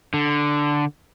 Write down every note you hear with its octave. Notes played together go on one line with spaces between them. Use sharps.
D3